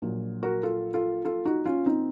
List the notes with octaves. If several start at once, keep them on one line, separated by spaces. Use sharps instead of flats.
A#1 A#2 F#3
F#4 A#4
F4 A4
F4 A4
F4 A4
D#4 F#4
C#4 F4
C4 D#4